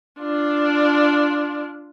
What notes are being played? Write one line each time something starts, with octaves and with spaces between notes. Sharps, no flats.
D4 F4